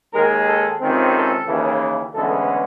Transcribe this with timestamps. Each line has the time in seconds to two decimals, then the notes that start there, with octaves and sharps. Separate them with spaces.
0.14 D#2 D#3 G#3 A#4
0.47 A4
0.81 C#2 C3 D#3 G#3 C4
1.14 A4
1.47 D#2 C#3 E3
2.14 D2 C#3 E3 G#3 B3 A4